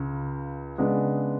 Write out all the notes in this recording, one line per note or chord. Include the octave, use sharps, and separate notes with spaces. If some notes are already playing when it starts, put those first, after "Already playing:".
Already playing: C#2 C#3
C#3 G#3 B3 D4